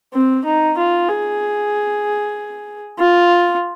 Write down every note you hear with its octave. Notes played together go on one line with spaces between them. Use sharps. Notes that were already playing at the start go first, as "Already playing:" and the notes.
C4
D#4
F4
G#4
F4